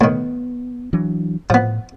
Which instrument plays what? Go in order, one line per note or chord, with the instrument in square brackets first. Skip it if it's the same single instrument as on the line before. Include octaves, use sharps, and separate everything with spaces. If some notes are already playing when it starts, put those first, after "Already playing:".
[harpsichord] A2 D#3 [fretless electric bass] B3
[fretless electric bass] E3 F#3 D4
[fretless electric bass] A2 [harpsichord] F3 B3